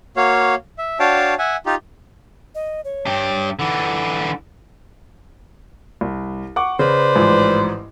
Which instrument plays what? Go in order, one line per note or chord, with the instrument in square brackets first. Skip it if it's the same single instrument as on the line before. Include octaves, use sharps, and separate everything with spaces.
[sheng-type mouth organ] A#3 F#4 C#5 F5
E5
D4 F#4 C#5 F5 G5 A5
E5 F#5 G#5
D#4 F4 G4
[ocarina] D#5
C#5
[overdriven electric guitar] G2 G4
[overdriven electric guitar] D3 E3 [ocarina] F#5
[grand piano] C2
F#5 C#6 D6
[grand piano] C#3 [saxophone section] B4 C5 D5
[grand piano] A1 G#2 F3